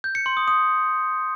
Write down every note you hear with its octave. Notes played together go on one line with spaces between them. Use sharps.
G6
C#7
C6
D#6
D#6